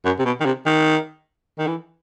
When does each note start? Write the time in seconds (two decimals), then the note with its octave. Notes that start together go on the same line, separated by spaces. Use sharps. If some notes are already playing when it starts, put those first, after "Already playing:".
0.05 F#2
0.19 C3
0.25 B2
0.40 D#3
0.45 C3
0.66 D#3
1.58 D#3
1.67 E3